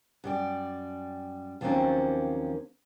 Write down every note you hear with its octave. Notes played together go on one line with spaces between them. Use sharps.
F#2 G3 D5
D#2 F3 F#3 A#3 C4 C#4